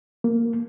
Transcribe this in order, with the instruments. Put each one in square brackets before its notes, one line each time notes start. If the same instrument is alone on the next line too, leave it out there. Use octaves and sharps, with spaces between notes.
[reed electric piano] A#3